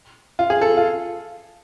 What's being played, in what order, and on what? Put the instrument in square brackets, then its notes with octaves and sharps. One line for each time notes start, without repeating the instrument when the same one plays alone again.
[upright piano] F4
G#4
A4
F4